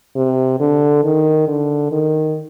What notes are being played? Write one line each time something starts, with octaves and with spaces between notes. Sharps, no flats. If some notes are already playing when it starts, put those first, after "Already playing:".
C3
D3
D#3
D3
D#3